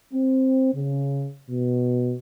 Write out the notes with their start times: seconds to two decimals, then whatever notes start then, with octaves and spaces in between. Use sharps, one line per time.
0.13 C4
0.74 C#3
1.50 B2